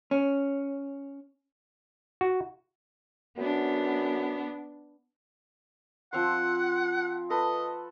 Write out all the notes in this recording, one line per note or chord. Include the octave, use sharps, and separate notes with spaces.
C#4
F#4
F#2 B3 D4
F3 C4 F#5 C6
A4 B4 D#5